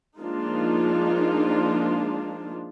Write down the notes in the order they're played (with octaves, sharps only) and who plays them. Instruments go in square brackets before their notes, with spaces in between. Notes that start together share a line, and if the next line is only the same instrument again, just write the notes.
[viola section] F3 G#3 A#3 D4 D#4 F4